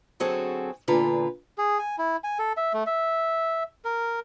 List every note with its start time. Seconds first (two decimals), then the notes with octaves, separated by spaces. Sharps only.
0.20 D3 F#3 C4 F#4 G#4 A4
0.88 E2 A#2 D3 F4 B4 A#5
1.58 G#4
1.79 G#5
1.98 E4
2.24 G#5
2.39 A4
2.57 E5
2.73 A3
2.87 E5
3.85 A#4